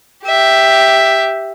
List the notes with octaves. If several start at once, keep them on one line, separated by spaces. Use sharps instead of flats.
G4 E5